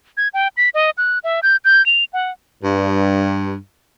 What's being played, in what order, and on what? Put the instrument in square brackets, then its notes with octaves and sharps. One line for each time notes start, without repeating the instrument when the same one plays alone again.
[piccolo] G#6
G5
B6
D#5
F#6
E5
G6
G6
F7
F#5
[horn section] G2